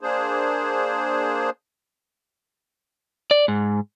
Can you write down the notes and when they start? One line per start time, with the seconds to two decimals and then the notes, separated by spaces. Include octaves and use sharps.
0.01 A#3 D4 G#4 C5
3.31 D5
3.48 G#2